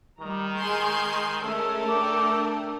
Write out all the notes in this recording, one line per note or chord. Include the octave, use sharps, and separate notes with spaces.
D#3 G3 A#5
G#3 G#5 C6 G6
G#3 A3 C#4 A4 A#4
D4 G5 D6